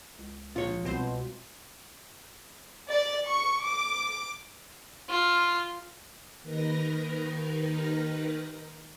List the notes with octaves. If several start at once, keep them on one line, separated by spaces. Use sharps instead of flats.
C#2
A#1 F4 C#5
C2 B2 C4 C5
D5
C#6
D6
F4
D#2 D#3 D#4 A#4 B4 A#6